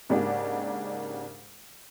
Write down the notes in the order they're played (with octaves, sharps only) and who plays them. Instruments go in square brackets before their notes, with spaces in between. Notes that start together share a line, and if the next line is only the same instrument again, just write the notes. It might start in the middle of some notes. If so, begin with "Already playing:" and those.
[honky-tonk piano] G#2 C#3 A#3 D4 D#4 G4